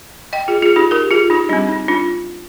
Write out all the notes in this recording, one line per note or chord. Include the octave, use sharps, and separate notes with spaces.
D#5 G5
F4 G#4
F4 G#4
D#4 G4
G4 A#4
F4 G#4
D#4 G4
G3 C4 D4
D#4
D4 F4